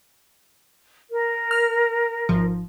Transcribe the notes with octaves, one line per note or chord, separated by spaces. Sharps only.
A#4
F6
G#1 F3